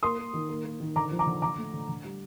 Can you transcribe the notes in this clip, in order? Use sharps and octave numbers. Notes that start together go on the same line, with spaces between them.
A#3 C6 D#6
A#3
D#3
A#3
A#3
D#3
D3 A#5 D6
F3
A#5 D6
D3
D3 A#5 D6
A3
D3
D3
G3